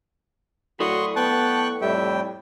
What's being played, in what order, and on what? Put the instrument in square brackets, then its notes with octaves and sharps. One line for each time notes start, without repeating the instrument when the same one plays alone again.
[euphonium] A2 [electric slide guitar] E4 A4 D5 [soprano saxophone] F#4 [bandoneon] C6 C#6 D#6
[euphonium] B3 [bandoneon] G5 C#6 F#6 [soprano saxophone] A5
[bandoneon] F2 A2 G5 [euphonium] G3 [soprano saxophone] E5